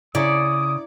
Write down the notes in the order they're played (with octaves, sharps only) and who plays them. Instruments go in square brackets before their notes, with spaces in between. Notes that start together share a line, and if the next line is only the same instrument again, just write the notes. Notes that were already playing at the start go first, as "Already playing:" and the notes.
[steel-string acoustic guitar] C#3 [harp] E4 A#5 C#7 [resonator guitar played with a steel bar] D5 [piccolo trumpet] D#6